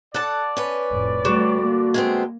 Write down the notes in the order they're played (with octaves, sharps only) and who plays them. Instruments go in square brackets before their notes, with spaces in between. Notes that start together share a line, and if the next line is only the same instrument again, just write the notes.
[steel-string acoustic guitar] A4 [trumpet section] D5 [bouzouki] F#5 A5
[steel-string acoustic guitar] C#4 B4
[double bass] F1 A2
[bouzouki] D3 F#4 [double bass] G3 A3
[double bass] A#3
[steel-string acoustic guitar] G#3 B3 C4